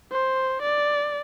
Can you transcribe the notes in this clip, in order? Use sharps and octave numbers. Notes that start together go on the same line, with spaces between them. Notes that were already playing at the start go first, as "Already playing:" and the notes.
C5
D5